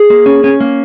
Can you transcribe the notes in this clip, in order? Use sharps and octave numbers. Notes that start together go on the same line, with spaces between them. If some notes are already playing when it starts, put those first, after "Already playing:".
Already playing: G#4
A#3
C#4
C#4
A#3